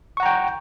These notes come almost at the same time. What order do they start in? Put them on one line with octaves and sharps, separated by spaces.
C#6 F#5 A#5 G5